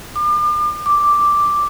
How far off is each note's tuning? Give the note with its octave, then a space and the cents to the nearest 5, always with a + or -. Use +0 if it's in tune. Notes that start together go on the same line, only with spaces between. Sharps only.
D6 +40
D6 +0